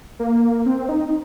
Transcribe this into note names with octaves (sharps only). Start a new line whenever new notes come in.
A#3
C4
D#4